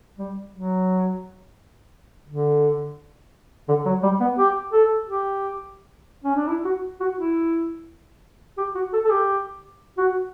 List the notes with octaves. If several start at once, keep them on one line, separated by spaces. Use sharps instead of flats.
G3
F#3
D3
D3
F#3
G3
B3
G4
A4
G4
C#4
D4
E4
F#4
F#4
E4
G4
F#4
A4
A4
G4
F#4